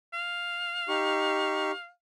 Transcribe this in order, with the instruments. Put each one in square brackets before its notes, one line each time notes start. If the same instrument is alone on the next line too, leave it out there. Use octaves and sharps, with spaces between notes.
[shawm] F5
[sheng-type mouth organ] D#4 G4 C#6